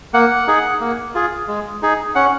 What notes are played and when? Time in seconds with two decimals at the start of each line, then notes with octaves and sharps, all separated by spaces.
0.13 A#3 F#5
0.47 D#4 G#4
0.80 A#3
1.15 F4 G#4
1.48 G#3
1.82 D#4 G#4
2.15 C#4 F#5